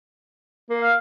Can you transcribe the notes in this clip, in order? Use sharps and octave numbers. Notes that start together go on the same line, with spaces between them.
A#3
F5